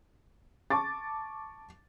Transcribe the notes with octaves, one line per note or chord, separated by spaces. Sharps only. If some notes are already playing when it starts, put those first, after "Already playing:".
A5 C#6 D6 A6